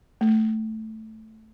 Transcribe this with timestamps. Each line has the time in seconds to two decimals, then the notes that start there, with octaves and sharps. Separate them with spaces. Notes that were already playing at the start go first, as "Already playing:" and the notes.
0.21 A3